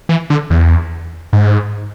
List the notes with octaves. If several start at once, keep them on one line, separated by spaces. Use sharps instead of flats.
E3
D3
E2
G#2